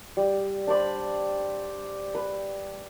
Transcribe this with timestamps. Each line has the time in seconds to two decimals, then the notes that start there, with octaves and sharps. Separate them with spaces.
0.17 G3
0.67 D4 C5 D5 B5
2.15 B4